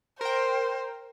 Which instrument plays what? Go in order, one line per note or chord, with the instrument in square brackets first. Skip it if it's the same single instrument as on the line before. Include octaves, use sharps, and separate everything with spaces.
[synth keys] A#4 G5 [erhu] C5